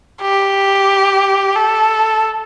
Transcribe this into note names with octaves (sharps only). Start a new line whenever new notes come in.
G4
A4